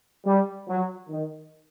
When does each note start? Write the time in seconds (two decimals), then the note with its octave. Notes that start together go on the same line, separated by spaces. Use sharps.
0.25 G3
0.67 F#3
1.09 D#3